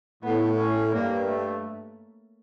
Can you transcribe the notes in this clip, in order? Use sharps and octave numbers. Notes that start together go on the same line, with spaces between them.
A2 B3
C#4
G2 A#3
A3